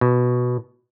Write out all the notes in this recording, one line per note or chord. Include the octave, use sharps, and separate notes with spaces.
B2